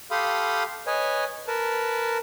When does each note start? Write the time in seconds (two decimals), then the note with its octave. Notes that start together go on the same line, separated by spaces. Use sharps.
0.11 G4 A4 F5 B5 C6 D#6
0.87 B4 C#5 D#5 G#5
1.47 A#4 B4 A5